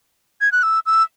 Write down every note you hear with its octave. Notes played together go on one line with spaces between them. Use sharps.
G#6
F#6
E6
E6